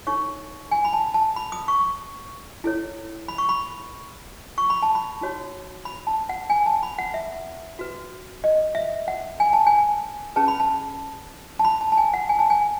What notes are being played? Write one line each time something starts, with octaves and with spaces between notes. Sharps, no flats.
D#4 A4 C#5 C#6
G#5
B5
A5
A5
B5
D#6
C#6
E4 A4 C#5
B5
C#6
B5
C#6
B5
A5
B5
D#4 F#4 C#5
B5
A5
F#5
G#5
A5
B5
F#5
E5
F#4 B4
D#5
E5
F#5
G#5
A5
G#5
C#4 G#4 B4 A5
B5
A5
A5
B5
A5
A5
G#5
F#5
G#5
A5
G#5